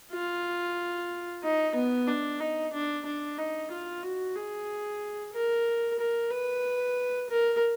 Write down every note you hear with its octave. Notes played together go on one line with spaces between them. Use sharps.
F4
D#4
B3
D4
D#4
D4
D4
D#4
F4
F#4
G#4
A#4
A#4
B4
A#4